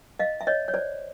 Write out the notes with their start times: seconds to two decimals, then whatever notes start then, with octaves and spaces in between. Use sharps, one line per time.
0.19 D#5 F5
0.41 E5
0.47 C#5 D#5
0.68 C#5
0.74 C5 D5